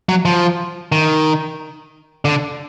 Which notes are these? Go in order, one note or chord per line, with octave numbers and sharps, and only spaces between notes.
F#3
F3
D#3
D3